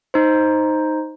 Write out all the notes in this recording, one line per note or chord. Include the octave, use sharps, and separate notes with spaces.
D#4 C5